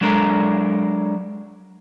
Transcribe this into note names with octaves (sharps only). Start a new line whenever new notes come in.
F#3 G#3 D4 A4 A#4